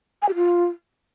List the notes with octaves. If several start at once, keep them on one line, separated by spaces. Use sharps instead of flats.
G#5
G4
F4